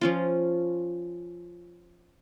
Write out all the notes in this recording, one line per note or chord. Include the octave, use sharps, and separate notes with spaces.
F3 C#4 F4